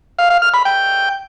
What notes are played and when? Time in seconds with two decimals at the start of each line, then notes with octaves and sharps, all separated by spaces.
0.19 F5
0.30 F5
0.42 F6
0.54 B5
0.65 G5